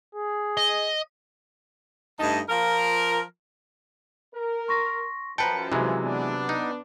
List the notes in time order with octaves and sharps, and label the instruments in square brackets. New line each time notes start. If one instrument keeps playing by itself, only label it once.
[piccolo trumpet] G#4
[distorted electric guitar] D#5
[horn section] G2 A3 D#4 D#5 A5
F3 F4 A#4
[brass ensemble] A#4
[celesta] C6 C#6 A#6
[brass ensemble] F#2 F3 [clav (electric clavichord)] B4 G5 [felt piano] A5 A#5 [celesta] C#7
[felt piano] C3 F#3 [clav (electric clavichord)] E3 G#3 [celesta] A#5
[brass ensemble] B3 D4
[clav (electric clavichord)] D#4